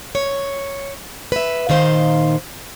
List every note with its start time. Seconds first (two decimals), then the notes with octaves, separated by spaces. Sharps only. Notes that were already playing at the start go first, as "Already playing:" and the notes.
0.15 C#5
1.32 B4 E5
1.69 A#2 D#3 D#4 C5 F5